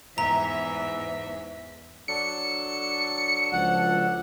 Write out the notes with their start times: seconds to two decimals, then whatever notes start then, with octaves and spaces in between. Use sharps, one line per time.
0.18 E2 G#2 E3 E5 A#5
2.08 F#3 D4 A4 C#7
3.53 C#2 F3 F#5